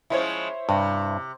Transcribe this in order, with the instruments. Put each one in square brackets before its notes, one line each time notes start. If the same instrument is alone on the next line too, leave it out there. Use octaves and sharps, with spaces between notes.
[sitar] F3 G#3 C#4 [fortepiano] E4 C5 C#5
[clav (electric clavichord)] G2 [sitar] C3